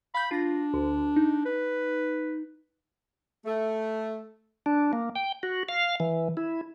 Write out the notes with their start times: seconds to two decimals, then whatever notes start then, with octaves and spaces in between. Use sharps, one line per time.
0.14 F5 B5 G6
0.31 D4 F4 A#6
0.74 D2
1.16 D#4
1.46 B4
3.46 A3
4.66 D4
4.93 A#3
5.15 G5
5.43 F#4
5.69 F5
6.00 E3
6.37 E4